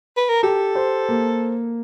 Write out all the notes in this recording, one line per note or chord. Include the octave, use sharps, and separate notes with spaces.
B4
A#4
G4 A4
C5
A#3